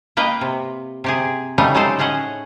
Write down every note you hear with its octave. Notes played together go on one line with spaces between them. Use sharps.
A#3 B4 D#5 G5
C3
C3 G4 G#4
C#3 G3 A3 B3 D#4
F#3 G#3 D#4 G4 A4 C5
A2 C#4 G#4 D#5 F#5